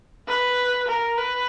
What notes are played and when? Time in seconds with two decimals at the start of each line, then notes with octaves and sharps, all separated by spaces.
0.28 B4
0.88 A#4
1.17 B4